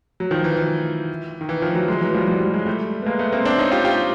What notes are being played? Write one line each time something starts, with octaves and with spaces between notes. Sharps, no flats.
F#3
D#3 F3
E3
E3
D#3
E3
D#3 F3
E3 F#3
F#3 G#3
E3 F#3
F3 G3
F3 G3
F3 G3
F#3 G#3
G3 A3
B3
G#3 A#3
A3 B3
A#3 C4
C4 D4
C#4 D#4
F4 G4
F4 G4